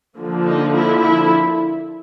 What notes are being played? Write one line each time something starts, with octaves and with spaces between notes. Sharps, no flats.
D3 F3 A#3
D#4
E4
E4